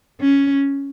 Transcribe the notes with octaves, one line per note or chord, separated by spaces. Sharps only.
C#4